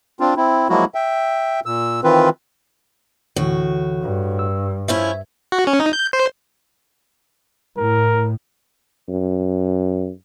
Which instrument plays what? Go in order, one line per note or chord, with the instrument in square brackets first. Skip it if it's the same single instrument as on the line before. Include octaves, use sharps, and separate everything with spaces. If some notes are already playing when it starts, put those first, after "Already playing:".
[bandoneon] C4 D4 F4
C4 E4
F3 F#3 G#3 A#3 E4 F#4
E5 G5
A#2 E6
D#3 E3 C4 F4 B4
[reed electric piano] D2 D3 E3 [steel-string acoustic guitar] A2 F#4
[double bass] G2
[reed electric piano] E6
[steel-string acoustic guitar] F3 C#4 E4 [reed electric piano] E5
[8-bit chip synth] F#4
C#4
D#4
G6
C5
[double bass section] A2 [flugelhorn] A#4
[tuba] F#2